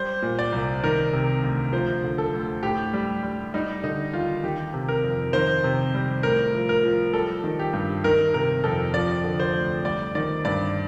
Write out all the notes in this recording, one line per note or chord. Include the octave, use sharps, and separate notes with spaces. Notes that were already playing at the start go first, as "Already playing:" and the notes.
Already playing: G3 C5
A#2
D5
C2
D#3 A#4
C3
D2
F3 C5
D3
A4
D2
A2 G4
G3
G3
G3 D#4
D3 D#4
D#2 F4
D#3 G4
C3
A#4
F2
D#3 C5
C3
G3
A2 A#4
F3
A#4
F3
G3 A4
D#3
G4
G2
D#3 A#4
C3 A#4
F2 A4
F3 D5
D3
C5
D2
G3 D5
D#3 D5
G2 D5